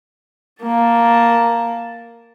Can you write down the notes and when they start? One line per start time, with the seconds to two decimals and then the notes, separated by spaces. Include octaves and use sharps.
0.62 A#3 A5